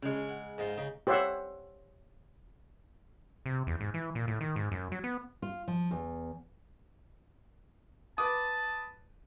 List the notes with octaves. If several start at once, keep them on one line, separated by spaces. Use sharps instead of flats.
C#3 G#3
F#5
G#2 D#4 F4
C#3 D#4
G4 C5 C#5 E5 F#5
C3
E2
G#2
E3
A#2
A2
D#3
G#2
F#2
F#3
B3
F4
F3
E2
B4 A5 D6 D#6